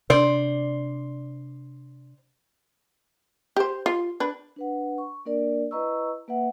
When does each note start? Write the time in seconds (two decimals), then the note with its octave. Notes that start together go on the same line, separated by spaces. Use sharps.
0.10 C3 D4 C5 D5
3.56 G4 C5
3.86 F4
4.20 D4 B4
4.56 D4 B4 F#5
4.98 C#6
5.26 A#3 D4 A#4 D5
5.71 E4 B4 D#5 A#5 C#6 E6
6.28 A#3 B4 E5 F#5